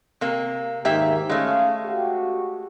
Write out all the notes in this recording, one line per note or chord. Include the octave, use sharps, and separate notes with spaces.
C3 A#3
D#2 G#2 D#3 A#3 G4 E5
G#3 A3 C#4 F5
F#4 G4